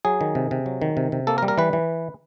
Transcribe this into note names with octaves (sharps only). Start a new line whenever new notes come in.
F#3 G#4
D#3
C3
C3
F#3
D#3
C3
C3
A#3 A4
A#4
G3
A#4
E3 B4
E3